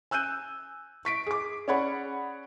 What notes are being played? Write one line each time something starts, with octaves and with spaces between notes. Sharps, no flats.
G#5 E6 F#6 G6 D#7
C#6 B6 D7
G#4 D6
C#4 G#4 C#5 D5 F#5 B5